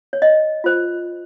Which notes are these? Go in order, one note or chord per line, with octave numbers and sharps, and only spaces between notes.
C#5
D#5
F4 C5